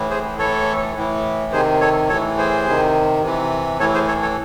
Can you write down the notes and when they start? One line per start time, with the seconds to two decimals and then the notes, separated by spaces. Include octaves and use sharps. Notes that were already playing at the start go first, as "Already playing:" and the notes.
Already playing: A2 E3
0.10 G#4 C5
0.39 A2 E3 A4 C#5
0.96 A2 E3
1.52 C3 D#3 G#4 C5
1.81 A4 C#5
2.09 A2 A4 C#5
2.13 E3
2.38 G#4 C5
2.66 C3 D#3
3.23 C3 E3
3.79 A2 E3 A4 C#5
3.94 G#4 C5
4.08 A4 C#5
4.22 A4 C#5